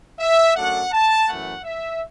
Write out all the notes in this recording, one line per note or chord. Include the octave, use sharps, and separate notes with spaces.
E5
F#2 F#3 A3 D4 F#5
A5
F#2 E3 A3 F#5
E5